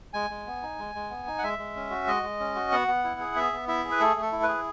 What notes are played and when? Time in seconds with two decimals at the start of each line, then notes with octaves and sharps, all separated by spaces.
0.14 G#3 G#5
0.30 G#3
0.47 B3
0.62 D#4
0.79 G#3
0.95 G#3
1.10 B3
1.27 D#4
1.38 F#5
1.43 G#3 E5
1.58 G#3
1.76 C#4
1.91 F#4
2.07 G#3 D#5
2.23 G#3
2.40 C#4
2.55 F#4
2.72 B3 F#5
2.88 B3
3.04 E4
3.20 G#4
3.35 B3 E5
3.53 B3
3.68 E4 E5
3.85 G#4
3.91 B4
4.00 A3 A4
4.16 A3
4.22 A4
4.32 E4
4.43 B4
4.48 G#4